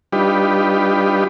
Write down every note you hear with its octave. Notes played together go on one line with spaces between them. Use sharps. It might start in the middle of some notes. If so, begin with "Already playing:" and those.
G3 D4 D#4 F4 G4 B4